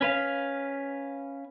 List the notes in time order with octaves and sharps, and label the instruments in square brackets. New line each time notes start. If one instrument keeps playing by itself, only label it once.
[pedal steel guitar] C#4 B4 F5